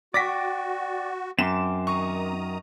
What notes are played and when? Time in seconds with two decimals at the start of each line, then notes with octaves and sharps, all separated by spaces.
0.14 F#4 D5 G5 C#6 D6 A#6 B6
1.39 F#2 C4 C6 D6 E7
1.87 D#3 A#5 C#6 D#6